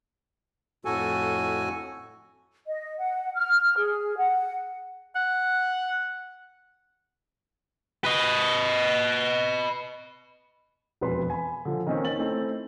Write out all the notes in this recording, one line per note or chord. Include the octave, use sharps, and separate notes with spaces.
F2 A2 F#4 A4 G#5
D#5
F#5
F6
G#4
F#5
F#5
B4 D#5
E1 F2 B4 C6
G#5 B5
D3 F3
D#3 A#3 C4 C#4 D#4 C#5
C#4 A6 F#7
A3 C4 D#4 E4